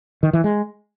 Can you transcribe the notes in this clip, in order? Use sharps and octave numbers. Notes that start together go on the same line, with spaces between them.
D#3
E3
G#3